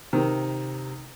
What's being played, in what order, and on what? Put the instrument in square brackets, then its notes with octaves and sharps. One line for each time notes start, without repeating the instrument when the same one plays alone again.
[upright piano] C3 [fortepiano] D#3